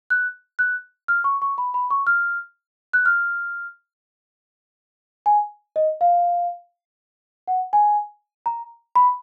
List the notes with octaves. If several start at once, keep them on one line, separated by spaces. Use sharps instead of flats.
F#6
F#6
F6
C#6
C#6
B5
B5
C#6
F6
F#6
F6
G#5
D#5
F5
F#5
G#5
A#5
B5